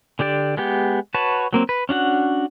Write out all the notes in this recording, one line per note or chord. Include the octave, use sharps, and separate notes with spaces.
D3 D4 G4 D5
G#3 B3 G4
F#4 B4 C#5 A5
F#3 A#3 C4
B4
C#4 D4 F#4 F#5